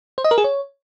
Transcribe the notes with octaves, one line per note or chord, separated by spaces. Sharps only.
C5
D#5
A#4
G#4
C#5